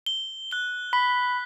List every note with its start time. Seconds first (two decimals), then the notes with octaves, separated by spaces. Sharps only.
0.06 G7
0.51 F#6 G7
0.93 B5 B6